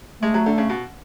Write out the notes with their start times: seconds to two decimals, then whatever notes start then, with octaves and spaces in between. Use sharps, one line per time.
0.22 G#3 A3
0.34 F#3
0.46 D3
0.58 C#3
0.70 B2